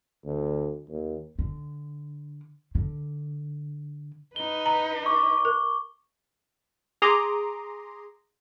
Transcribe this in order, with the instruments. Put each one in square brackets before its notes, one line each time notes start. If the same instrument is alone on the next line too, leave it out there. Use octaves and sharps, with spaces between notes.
[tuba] D2
D#2
[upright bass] D3
D3
[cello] D#4 B4 [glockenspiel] G7
[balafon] A#5
[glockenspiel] C#6 D6
[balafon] A#4
[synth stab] G#4 A#5 C6 D6 D#6